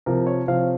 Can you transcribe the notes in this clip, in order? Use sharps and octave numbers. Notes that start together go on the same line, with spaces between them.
C3 F3 C4 A#4
C#5
C3 F3 C4 F5